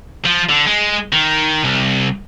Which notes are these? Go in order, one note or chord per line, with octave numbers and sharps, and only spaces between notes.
F3
D3
G#3
D#3
C2